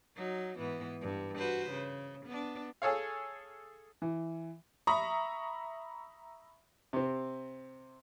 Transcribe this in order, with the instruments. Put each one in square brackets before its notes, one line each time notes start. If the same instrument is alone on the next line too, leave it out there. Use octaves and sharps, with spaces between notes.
[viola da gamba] F#3 D#4
G#2 E3 B3
G2
F#4 B4 C5
C#3
B3 D4
[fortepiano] G#4 A4 C#5 F5
[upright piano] E3
E5 A#5 B5 C#6 D#6
[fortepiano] C3 C4